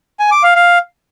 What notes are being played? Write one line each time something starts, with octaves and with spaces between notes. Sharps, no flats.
G#5
D6
F5
F5